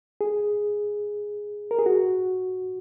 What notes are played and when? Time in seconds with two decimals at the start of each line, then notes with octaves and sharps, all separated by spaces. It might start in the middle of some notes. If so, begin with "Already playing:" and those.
0.21 G#4
1.71 A#4
1.79 G#4
1.86 F#4